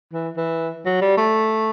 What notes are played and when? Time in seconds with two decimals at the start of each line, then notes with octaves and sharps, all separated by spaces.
0.13 E3
0.37 E3
0.85 F#3
1.01 G3
1.17 A3